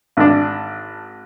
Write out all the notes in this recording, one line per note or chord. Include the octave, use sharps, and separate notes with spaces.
G#1 D4